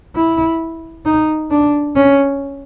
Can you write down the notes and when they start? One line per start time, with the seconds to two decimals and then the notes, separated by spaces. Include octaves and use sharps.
0.16 E4
1.05 D#4
1.51 D4
1.96 C#4